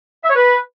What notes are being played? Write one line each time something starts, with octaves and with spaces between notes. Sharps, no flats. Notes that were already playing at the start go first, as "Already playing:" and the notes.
E5
C#5
B4